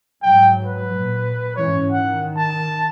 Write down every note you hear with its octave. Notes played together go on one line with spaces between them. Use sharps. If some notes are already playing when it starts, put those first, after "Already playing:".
G#2 F#3 G5
B4
A#2
G#2 E3 C#4 C#5
D#3 F#5
A5